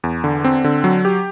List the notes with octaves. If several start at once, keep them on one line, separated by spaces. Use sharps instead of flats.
E2
D3
C4
D3
F#3
G4